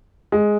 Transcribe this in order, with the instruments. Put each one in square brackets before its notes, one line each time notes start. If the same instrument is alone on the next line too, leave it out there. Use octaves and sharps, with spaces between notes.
[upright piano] G#3